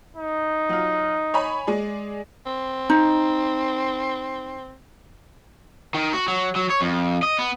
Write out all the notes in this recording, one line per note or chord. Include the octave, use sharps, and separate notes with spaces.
D#4
F#3 F4
C#5 G#5 B5
G#3 G#4 D5
C4
D#4
D#3
F#4
F#3
F#3
C#5
F2
D#5
B3